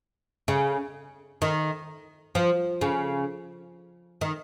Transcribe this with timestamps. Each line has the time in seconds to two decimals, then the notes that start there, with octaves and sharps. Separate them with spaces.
0.48 C#3
1.42 D#3
2.35 F3
2.81 C#3
4.21 D#3